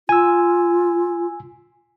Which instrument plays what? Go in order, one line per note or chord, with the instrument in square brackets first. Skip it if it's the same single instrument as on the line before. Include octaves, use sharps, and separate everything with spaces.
[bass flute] F4 [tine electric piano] G#5 E6